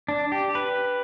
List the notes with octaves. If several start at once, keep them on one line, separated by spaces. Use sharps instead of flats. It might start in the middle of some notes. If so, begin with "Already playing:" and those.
D4
G4
B4